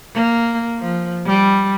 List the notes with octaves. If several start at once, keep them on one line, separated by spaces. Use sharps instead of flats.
A#3
F3
G3